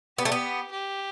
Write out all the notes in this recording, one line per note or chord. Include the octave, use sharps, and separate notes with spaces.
B3 G4
A3
B3
G4